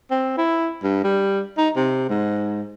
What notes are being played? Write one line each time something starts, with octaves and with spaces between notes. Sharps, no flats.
C4
E4
G2
G3
D#4
C3
G#2